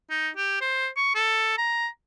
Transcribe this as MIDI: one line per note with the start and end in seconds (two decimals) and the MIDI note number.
0.10 0.29 63
0.37 0.58 67
0.62 0.89 72
0.97 1.11 85
1.15 1.54 69
1.58 1.87 82